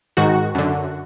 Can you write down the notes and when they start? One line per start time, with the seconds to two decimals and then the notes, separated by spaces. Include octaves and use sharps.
0.17 G#2 D#3 F#4
0.55 F#2 D3